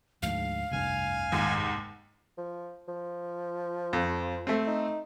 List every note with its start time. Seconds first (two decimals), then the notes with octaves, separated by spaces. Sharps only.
0.22 D2 G#2 F3 F5
0.71 F1 C2 G2 G#5 F6
1.32 D#2 G#2
2.38 F3
2.88 F3
3.93 F2
4.47 A3 C4
4.67 D#4